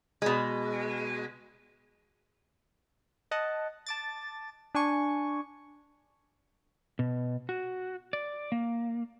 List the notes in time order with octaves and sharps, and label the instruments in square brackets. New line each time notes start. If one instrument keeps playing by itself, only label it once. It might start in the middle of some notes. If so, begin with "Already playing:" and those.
[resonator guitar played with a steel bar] B2 G#3
[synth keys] D#5 F#5 A5
A5 D6 A6
D4 G#5 C#6
[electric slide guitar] B2
F#4
D5
A#3